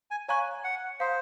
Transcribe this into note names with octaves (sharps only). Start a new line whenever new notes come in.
G#5
C#5 F5 G#5 A#5 C#6 F#6
F#5
C5 F5 A#5 D#6